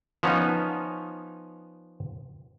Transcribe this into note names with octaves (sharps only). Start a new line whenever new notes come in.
F3 B3 C#4 D#4